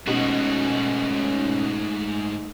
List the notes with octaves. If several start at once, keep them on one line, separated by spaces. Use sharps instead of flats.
G#2 B2 A3 C#4 D#4 F#4